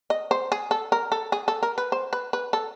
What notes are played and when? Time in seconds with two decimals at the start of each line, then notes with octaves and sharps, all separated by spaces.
0.10 D#5
0.31 C5
0.52 G#4
0.71 A4
0.92 A#4
1.12 A4
1.32 G#4
1.48 A4
1.63 A#4
1.78 B4
1.92 C5
2.13 B4
2.33 B4
2.53 A4